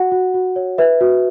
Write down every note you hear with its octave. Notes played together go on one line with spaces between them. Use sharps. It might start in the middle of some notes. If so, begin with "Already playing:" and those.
Already playing: F#4 F#5
F#4
F#4
C#5
B4 E5
F#4